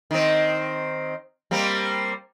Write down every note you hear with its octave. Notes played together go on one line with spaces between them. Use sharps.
D#3 C4
G3 A#3 C4